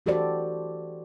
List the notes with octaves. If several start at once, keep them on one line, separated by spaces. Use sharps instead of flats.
E3 F#4 G4 A4 C5 D5